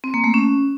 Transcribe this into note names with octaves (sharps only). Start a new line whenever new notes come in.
C4
A#3
A3
C#4